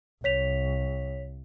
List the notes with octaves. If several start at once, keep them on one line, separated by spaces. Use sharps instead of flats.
C2 C#5 B6 F7